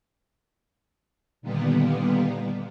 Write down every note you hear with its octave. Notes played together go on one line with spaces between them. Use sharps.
A#2 D3 D#3 G3 A#3 B3